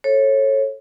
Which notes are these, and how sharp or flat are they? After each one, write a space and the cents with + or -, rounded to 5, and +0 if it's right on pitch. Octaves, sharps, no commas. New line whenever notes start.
A4 +0 C#5 -25